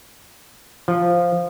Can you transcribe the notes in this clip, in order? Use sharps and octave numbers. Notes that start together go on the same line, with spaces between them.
F3